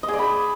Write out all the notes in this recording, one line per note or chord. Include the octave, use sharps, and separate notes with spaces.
D#5
G#4
D5
B5